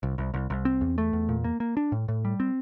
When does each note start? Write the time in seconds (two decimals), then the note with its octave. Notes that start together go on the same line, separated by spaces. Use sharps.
0.03 C2
0.18 C2
0.34 C2
0.50 C2
0.65 C4
0.81 E2
0.98 A3
1.13 E2
1.29 A#2
1.44 A#3
1.60 A#3
1.77 D4
1.92 A2
2.08 A2
2.25 G3
2.40 C4